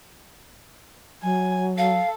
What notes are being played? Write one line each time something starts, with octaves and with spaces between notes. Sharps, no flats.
F#3 G#5
A4 F5